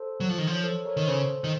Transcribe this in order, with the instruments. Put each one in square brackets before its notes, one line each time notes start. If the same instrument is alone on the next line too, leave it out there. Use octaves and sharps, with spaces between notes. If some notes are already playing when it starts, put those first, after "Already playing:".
Already playing: [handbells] A4 C5
[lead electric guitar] F#3
F3
D#3
[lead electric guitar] F3 [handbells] C#5
[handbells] A4 C5
A#4 C#5
[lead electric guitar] D#3
[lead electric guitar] C#3 [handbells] A4 C5
[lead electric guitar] D#3